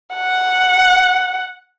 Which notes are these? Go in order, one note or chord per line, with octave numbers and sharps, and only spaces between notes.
F#5